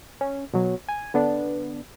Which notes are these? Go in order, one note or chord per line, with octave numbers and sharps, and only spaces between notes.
C#4
B2 F#3
G#5
D3 B3 D4